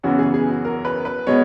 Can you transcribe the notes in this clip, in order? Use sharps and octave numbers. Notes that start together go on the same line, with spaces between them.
F#2 C#3 E3 B3 F#4
G#4
G#4
F#4
A#4
B4
B4
B2 G#3 B3 C#5